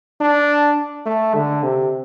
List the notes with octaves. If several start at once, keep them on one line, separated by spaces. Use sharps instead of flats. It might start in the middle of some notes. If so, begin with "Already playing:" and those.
D4
A3
D3
C3